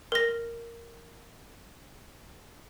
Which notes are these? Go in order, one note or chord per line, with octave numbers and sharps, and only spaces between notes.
A#4 A#6